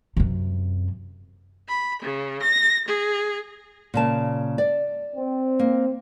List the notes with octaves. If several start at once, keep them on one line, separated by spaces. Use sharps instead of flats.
F#2 C3
B5
C#3
A#6
G#4
A#2 C#3 A5
D5
C4
A#3